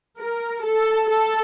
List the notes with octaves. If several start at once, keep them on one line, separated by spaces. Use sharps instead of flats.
A#4
A4
A4